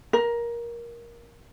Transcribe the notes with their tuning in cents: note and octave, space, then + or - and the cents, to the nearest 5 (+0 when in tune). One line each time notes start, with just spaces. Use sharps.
A#4 +15